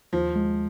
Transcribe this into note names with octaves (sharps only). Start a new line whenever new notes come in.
D#2 F3
G#3